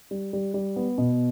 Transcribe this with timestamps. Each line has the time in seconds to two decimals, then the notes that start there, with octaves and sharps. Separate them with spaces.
0.11 G3
0.33 G3
0.54 G3
0.76 B3
0.98 B2